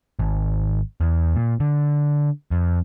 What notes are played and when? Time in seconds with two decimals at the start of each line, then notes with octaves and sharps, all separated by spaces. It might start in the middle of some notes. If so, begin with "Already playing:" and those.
0.19 G#1
1.01 E2
1.35 A#2
1.60 D3
2.51 F2